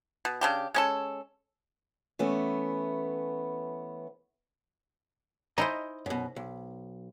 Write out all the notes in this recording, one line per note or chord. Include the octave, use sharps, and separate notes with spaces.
B2
C#3 D4 G4
G#3 C#4 A4
E3 A3 B3 C#4
D#4 E4 C5 D#5 G#5 A#5
F#2 B2
B1